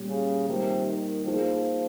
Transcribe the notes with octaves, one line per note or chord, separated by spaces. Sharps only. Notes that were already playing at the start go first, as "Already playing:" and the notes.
Already playing: A#2 G3 C#4 G4
C#3
C3 D#3 G3 A#3 F4 A#4
D#3
F3 A#3 D#4 G#4